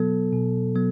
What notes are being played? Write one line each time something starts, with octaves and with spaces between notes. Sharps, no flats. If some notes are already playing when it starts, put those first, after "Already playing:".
Already playing: B2 F#3 B3 A4
B2
F#3 B3